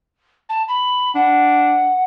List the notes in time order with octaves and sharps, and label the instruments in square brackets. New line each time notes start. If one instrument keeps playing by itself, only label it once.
[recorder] A5
B5
[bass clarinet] D4 [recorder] F#5